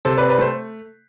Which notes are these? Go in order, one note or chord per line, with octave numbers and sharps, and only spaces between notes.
C3 A4 C5
B4 D5
C4
B4 D5
A3 A4 C5